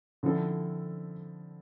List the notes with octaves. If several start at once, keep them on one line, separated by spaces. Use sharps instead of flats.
D3 F3 C4 E4 A4